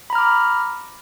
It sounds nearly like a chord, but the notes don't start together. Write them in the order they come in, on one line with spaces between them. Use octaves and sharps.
B5 A#5 F6 D6